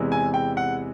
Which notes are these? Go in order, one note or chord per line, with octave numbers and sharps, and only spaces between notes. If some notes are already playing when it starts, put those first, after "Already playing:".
Already playing: E2 C3 E3 G#3
G#5
G5
F#5